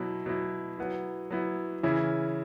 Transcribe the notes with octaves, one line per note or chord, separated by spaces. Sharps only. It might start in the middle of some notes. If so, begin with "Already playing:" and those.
Already playing: B2 F#3 E4
B2 F#3 E4
F#3 B3 E4
F#3 B3 E4
C#3 E3 C#4 E4